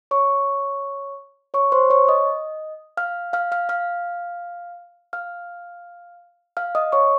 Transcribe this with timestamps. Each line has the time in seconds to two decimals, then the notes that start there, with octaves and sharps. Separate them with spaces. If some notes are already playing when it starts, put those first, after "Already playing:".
0.11 C#5 C#6
1.54 C#5 C#6
1.72 C5 C6
1.90 C#5 C#6
2.09 D#5 D#6
2.97 F5 F6
3.33 F5 F6
3.52 F5 F6
3.69 F5 F6
5.13 F5 F6
6.57 F5 F6
6.75 D#5 D#6
6.92 C#5 C#6